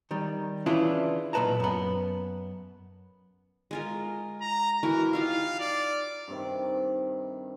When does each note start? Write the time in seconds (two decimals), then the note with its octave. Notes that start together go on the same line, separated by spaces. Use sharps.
0.11 D#3 G3
0.66 C#3 E3 D4 E4 F4
1.33 B1 A#2 E4 B4 A5 A#5
1.60 F#2 B3
3.71 G#3 F4 A#4
4.41 A#5
4.83 E3 E4 F#4 A#4
5.13 D#4 F4 G4 F5
5.59 D5
6.28 G2 C3 D#3